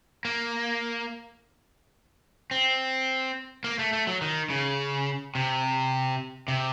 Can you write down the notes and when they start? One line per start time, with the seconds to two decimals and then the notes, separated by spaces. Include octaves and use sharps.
0.25 A#3
2.51 C4
3.64 A#3
3.79 A3
3.93 A3
4.07 F#3
4.22 D#3
4.50 C#3
5.35 C3
6.48 C3